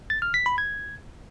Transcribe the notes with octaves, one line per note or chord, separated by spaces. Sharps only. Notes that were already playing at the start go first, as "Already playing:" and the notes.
A6
F6
B6
B5
G#6